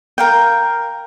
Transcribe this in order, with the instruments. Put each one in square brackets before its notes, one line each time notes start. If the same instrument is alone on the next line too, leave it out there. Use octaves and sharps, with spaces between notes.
[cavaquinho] A#4 F5 G5